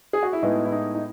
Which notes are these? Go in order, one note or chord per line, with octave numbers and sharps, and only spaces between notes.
G#4
F#4
E4
A2 G#3 B3 D#4
E4
D#4
D#4